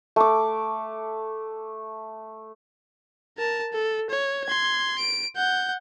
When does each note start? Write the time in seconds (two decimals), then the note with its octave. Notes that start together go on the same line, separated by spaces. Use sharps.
0.16 A3 D6
3.38 A#4 A5
3.73 A4
4.10 C#5
4.46 C6 G#6
4.98 D7
5.36 F#5 G6